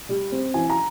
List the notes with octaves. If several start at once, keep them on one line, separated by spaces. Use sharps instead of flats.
G3
C4
E3 G#5
A#5